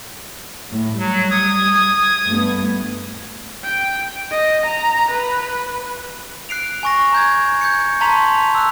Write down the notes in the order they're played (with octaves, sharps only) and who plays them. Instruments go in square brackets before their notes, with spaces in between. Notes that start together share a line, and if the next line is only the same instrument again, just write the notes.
[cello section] A2
[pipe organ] F#3 [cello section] G3
[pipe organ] D#6 G#6
[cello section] G2 A3 B3
[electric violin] G5
D#5
A#5
B4
[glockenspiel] F#6 C7 D7 F7
G#5 C#6 A#6
A#5 G6 G#6
G6 G#6 C#7
A5 A#5 C6 C#6 B6 F7
E6 F#6